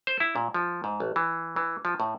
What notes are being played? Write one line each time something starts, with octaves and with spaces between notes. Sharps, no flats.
C5
E4
A#2
F3
G#2
A1
E3
E3
F3
A2